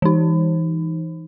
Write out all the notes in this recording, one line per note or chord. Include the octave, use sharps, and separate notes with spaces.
E3 D#4